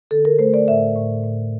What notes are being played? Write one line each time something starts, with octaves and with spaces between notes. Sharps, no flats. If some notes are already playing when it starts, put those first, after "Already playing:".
D3 A4
A#4
A3 C5
D5
A2 E5
A2
A2